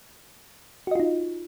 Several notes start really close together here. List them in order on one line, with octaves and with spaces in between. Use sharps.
F#4 D#5 F4 D#4